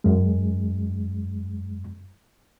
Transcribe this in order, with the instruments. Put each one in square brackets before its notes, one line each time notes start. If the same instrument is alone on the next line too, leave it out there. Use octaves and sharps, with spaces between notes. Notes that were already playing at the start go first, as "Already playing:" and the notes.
[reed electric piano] F#2 G#3